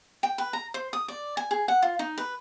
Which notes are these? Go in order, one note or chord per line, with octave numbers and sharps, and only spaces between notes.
G5
B4
A#5
C5
D#6
D5
G#5
G#4
F#5
F4
D#4
B4